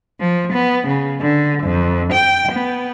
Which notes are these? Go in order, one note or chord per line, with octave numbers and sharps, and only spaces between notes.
F3
B3
C#3
D3
F2
G5
B3